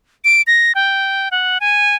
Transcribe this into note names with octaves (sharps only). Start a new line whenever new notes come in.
D7
A#6
G5
F#5
G#5